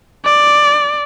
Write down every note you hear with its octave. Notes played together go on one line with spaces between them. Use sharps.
D5